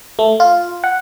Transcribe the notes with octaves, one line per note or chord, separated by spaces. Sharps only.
A3
F4
F#5